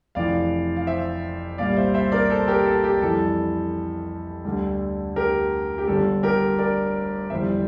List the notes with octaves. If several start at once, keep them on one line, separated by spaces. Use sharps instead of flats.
F1 F2 E3 D5 F5
F5
C5 E5
C2 A#2 G3 D5 F5
C5 E5
C5 E5
A#4 D5
A4 C5
G4 A#4
A4
G4
F2 E3 G3 A4
D2 D3 G3
G4 A#4
G4
G1 G2 D3 A3 A4
G4 A#4
A#4 D5
G1 F2 E3 G3 C5 E5